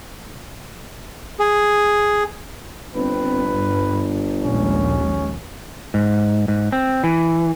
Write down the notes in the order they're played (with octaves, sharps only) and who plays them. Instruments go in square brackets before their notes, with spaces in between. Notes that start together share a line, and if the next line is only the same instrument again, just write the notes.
[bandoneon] G#4
[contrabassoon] G1 [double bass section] C4 [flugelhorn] B4
[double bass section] G2
[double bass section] A#1 D#2 G#3 [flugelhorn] C#4
[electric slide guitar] G#2
G#2
C4
E3